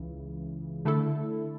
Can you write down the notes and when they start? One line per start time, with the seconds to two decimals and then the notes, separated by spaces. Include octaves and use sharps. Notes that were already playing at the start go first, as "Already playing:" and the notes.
Already playing: C#2 C#3 E3
0.85 D3 A3 E4 A4